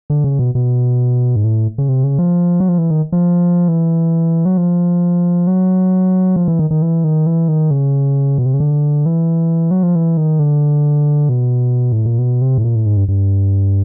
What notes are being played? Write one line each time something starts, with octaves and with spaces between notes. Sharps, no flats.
D3
C#3
B2
B2
G#2
A2
C#3
C3
C#3
F3
F#3
F3
E3
D#3
F3
E3
F#3
F3
F#3
F3
E3
D#3
D#3
E3
D#3
E3
D#3
C#3
B2
C3
C#3
D3
E3
F#3
F3
E3
D#3
D3
B2
A2
A#2
B2
C3
A2
A#2
A2
G#2
G2
G2